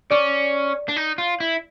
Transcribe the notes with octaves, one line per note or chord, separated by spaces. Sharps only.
C#4 D5
D4
D#4
F4
E4